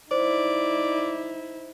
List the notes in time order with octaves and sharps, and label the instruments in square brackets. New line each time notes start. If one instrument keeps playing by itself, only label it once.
[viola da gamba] D#4 E4 [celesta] C5 [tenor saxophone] D5